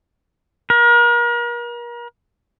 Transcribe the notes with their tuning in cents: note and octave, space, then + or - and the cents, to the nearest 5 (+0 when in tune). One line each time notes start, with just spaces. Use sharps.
A#4 +40